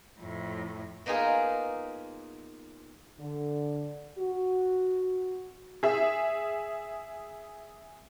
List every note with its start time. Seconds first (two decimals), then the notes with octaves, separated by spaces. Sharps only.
0.20 F2 A2
1.06 A#3 B3 D#4 F4 G#4
3.20 D3
4.18 F#4
5.83 G#4 E5